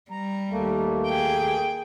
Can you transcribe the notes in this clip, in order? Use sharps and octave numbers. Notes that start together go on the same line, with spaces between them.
G3 A#5
D#2 A3 A#3
G#4 G5